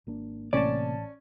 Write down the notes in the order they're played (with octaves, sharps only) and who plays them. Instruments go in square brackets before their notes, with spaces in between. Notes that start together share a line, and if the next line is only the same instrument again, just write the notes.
[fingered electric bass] G#1 A#3 D4
[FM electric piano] A1 A5 [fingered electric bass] C3 A#3 [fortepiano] C#4 [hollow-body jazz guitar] D5